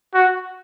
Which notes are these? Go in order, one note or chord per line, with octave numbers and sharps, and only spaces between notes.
F#4